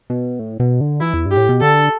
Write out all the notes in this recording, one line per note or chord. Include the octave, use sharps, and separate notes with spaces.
B2
A2
B2
D3
E3 E4
E2
G2
G4
A2
B2
D3 A4